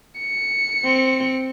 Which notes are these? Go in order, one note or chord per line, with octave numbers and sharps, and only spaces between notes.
C#7
C4